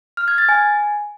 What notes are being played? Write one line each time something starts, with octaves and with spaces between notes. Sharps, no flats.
F6
G#6
A6
G#5